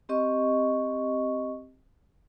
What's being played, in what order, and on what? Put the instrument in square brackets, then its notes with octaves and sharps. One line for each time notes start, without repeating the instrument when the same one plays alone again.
[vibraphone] C4 G4 D#5 C#6